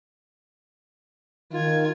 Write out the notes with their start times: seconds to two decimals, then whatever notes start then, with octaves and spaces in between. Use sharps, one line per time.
1.53 D#3 F4 G#6